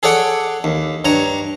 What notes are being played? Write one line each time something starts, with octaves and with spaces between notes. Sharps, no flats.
G#4 A4 C#5 D5 F#5
D#2
G2 C#5 A#5